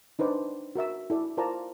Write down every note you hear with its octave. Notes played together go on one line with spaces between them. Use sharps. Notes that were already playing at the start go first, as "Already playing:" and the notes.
D4 D#4 B4 C5 D5
F#4 A#4 E5 E6
E4 A4 D5
F4 A#4 C5 D5 A5 A#5